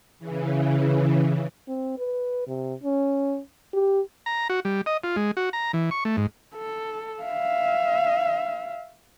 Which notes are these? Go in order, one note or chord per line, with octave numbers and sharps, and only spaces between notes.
C#3 E3
C4
B4
C3
C#4
G4
A#5
F#4
G3
D#5
F4
G#3
F#4
A#5
E3
C#6
A3
G#2
A4
E5 F5